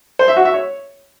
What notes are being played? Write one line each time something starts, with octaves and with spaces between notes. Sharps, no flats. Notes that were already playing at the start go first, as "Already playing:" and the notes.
C5
E5
F#4
E5
C#5